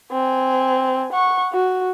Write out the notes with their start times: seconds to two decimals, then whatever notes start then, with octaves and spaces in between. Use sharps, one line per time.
0.12 C4 G#5
1.13 F#5 C#6
1.53 F#4